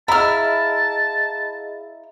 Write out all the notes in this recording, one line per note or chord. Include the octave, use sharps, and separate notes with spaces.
E4 G#4 D#5 F5 A5 A#5 F6